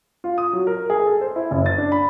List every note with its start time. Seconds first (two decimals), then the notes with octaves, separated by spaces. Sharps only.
0.24 F4
0.38 D#6
0.53 F#3
0.67 A#4
0.90 G#4
1.06 A4
1.21 C5
1.36 E4
1.51 F#1
1.66 A6
1.78 D4
1.92 B5